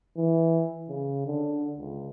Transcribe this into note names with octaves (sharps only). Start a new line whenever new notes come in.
E3
C#3
D3
C#2